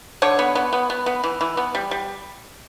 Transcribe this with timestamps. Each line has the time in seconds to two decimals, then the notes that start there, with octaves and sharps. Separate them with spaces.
0.22 D3 C#5
0.39 B3
0.55 B3
0.73 B3
0.90 B3
1.06 B3
1.24 E3
1.41 E3
1.57 B3
1.75 G3
1.91 G3